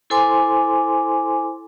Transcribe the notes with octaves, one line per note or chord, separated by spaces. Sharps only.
E4 A4 C5 G#5 C6 D6